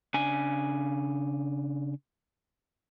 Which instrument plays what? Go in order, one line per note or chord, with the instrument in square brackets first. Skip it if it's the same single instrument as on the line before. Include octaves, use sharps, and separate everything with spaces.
[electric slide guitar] C#3 D4 G#5